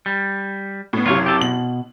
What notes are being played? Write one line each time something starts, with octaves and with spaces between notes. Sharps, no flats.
G3
A2 B3
F#1 C3 F4 C#5
G4 A4
B2 F#7